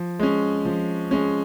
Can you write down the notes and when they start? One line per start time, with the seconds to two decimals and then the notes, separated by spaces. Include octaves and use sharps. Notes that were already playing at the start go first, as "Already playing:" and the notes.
Already playing: F3
0.20 G#3 C#4
0.65 F3
1.11 G#3 C#4